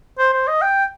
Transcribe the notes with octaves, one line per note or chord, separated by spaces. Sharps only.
C5
C5
D#5
G5